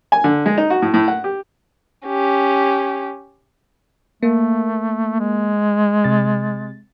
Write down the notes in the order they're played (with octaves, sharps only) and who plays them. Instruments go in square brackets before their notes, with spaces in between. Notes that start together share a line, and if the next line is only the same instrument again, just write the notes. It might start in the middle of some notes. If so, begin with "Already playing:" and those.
[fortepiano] G#5
D3
G#3
D#4
F#4
A2
A2
F#5
G4
[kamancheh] C#4 G4
[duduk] A3 [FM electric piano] A#3
[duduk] G#3
[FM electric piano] C3 A6